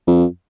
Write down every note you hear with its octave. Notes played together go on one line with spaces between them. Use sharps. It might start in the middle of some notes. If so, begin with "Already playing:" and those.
F2